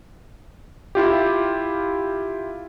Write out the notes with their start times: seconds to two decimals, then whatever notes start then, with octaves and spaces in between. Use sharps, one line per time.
0.95 E4 F4 G4